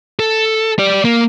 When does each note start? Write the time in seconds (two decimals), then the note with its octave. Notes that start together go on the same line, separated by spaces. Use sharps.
0.19 A4
0.79 G4 D5
1.05 A#3